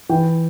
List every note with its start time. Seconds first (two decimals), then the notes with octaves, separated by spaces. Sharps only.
0.09 E3 G5